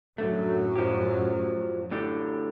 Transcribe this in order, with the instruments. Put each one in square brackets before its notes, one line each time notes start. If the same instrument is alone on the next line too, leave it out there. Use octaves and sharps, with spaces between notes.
[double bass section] F#2 A2 F#3 [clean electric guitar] D3 A3
[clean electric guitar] F3 G4
A2 D3 G4